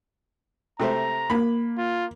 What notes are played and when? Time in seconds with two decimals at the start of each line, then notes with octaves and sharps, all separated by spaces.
0.80 C3 A3 C5 A#5
1.30 A#3 B5
1.78 F4